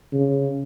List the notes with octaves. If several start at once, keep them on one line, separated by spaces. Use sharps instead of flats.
C#3